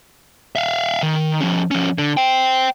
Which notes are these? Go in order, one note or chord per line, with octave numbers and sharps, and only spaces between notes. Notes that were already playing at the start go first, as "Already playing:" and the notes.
E5 F5
D#3
F3 C#4
F3 C#4
D3
C5 G5